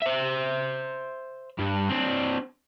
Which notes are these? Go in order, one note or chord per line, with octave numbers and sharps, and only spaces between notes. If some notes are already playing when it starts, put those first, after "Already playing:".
C5 E5
G2
C4 D4